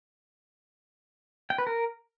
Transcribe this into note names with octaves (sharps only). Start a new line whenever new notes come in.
G5
B4
A#4